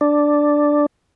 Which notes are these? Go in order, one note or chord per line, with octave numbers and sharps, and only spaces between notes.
D4